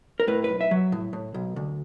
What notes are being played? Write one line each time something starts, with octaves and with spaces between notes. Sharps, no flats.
A#4
A2 B4
B1 B4
E5
F#3
A2
A2
B1
D2